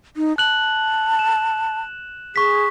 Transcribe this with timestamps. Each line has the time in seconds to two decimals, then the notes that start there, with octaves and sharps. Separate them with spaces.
0.17 D#4
0.38 A5 F#6 F#7
1.19 E7
2.36 G#4 C#6 B6